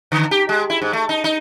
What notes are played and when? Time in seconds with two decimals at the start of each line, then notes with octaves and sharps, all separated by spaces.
0.12 D3
0.31 G4
0.49 G#3
0.70 E4
0.82 G#2
0.93 A3
1.09 D#4
1.24 D#4